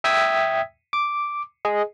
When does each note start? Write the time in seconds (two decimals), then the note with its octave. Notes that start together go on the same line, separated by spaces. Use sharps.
0.04 E5 G5 D#6 E6 G#6 B6
0.93 D6
1.65 G#4 D#5